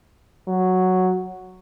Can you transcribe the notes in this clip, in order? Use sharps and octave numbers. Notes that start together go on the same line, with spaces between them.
F#3